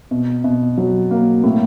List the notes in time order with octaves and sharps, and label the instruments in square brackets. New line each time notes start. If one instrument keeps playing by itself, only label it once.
[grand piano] B2
B2
F#3
A#3
A2